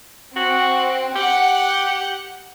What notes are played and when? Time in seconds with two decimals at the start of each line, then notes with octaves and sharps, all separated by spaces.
0.36 C4 F#4
1.16 G4 F#5